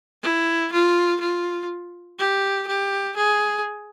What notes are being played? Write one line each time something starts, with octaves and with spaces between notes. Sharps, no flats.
E4
F4
F4
G4
G4
G#4